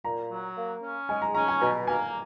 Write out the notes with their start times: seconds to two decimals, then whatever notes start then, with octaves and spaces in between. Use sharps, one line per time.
0.04 A#2 A#5
0.31 F#3
0.56 A#3
0.82 C#4
1.09 G#3 G#5
1.22 A#5
1.35 C#4 A#5
1.48 G#5
1.61 B2 A#5
1.87 A#3 G#5